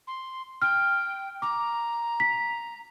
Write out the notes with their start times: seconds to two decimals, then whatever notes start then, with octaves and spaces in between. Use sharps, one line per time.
0.07 C6
0.62 G5 F6
1.42 A#5 D6
2.20 B6